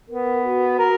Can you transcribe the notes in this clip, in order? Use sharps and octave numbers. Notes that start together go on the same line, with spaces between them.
B3 A#4
F#4
A#4